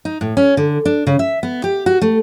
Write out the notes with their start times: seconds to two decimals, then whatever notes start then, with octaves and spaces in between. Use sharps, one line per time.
0.05 D#4
0.21 A2
0.37 C#4
0.57 D3
0.85 D4
1.07 C#3
1.19 E5
1.43 B3
1.64 G4
1.86 F#4
2.02 A3